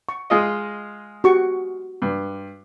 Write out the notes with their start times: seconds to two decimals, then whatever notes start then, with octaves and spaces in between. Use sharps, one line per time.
0.09 C#6
0.30 G#3 F4 D#5
1.24 F#4 G4 C#6
2.02 G2